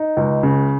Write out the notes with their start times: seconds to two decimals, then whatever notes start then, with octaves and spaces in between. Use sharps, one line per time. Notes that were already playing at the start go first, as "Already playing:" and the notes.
Already playing: D#4
0.17 C#2
0.43 C#3